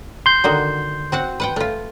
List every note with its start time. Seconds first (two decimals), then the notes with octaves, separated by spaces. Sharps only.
0.26 C6 G6
0.44 D3 D#3 F#4
1.12 C4 F#4 F#5
1.40 B4 F#5 G5
1.56 A3 F4